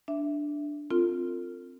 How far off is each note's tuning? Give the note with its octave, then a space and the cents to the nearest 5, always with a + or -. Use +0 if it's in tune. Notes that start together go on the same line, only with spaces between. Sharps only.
D4 +0 E5 +0
C4 +5 F4 +0 A4 +45